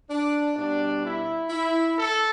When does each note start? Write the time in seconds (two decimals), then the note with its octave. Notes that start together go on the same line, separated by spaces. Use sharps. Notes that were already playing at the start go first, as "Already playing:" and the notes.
0.10 D4
0.56 B2 G3 D4
1.03 E4
1.50 E4
1.96 A4